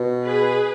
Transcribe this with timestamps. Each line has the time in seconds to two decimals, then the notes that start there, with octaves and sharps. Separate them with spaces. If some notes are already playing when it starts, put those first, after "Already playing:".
Already playing: B2
0.25 G#4 B4